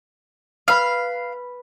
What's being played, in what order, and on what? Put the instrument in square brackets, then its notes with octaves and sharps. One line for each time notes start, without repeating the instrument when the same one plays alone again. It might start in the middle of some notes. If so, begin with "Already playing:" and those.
[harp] B4 B5 [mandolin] F5